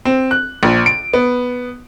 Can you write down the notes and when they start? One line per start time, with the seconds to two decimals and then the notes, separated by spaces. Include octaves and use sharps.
0.05 C4
0.31 F#6
0.63 A#1
0.86 D7
1.13 B3